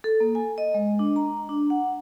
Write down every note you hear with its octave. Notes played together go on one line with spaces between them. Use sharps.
A4
A#3
G#5
D#5
G#3
D4
A#5
D4
F#5